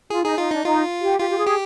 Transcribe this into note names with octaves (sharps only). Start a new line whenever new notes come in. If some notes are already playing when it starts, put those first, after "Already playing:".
F4 G#4
D#4 G#4
D#4 F4
D4 D#4
D#4 F4
G4
F4 G4
G4
G#4
G4